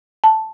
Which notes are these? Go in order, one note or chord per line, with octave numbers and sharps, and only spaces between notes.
A5